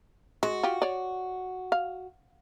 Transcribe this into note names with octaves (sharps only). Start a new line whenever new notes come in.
G#3 F#4
F4 G4
C#5 D5
F5